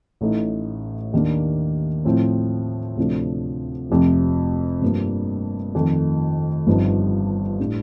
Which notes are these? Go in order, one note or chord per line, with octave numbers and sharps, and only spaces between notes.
A1 A2 A3 D#4
D#2 D#3 A#3 D4
A2 F3 C4
D2 C3 F3 A3 D4
F1 F2 C3
G2 F3 A#3 D4
F2 D#3 A3
G1 G2 F3 C4 D#4
A2 G3 D4